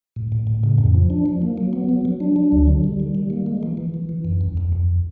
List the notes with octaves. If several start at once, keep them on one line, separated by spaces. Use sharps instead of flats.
A2
A2
A2
C#3
F2
F3
D4
F3
A#3
F#3
B3
F#3
F#3
D4
F#3
D2
D3
G3
D#3
G3
A#3
G#3
E3
E3
E3
E3
F#2
F2
F2
F2